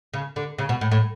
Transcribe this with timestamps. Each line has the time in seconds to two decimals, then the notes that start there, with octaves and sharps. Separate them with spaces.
0.13 C#3
0.36 D3
0.58 C#3
0.69 B2
0.81 A2
0.91 A2